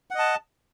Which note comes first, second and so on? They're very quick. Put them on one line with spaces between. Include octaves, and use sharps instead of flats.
F#5 D#5 A5